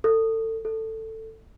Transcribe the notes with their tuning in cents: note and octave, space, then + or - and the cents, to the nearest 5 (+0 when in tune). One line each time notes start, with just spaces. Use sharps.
A4 +30
A4 +15